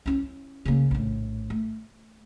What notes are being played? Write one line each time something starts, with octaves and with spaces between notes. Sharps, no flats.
C#4 E4
C#3 A#3
A#1 A2
A3